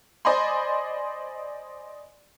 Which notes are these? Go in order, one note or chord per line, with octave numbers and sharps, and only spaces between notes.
C5 D5 D#5 G#5 B5 C6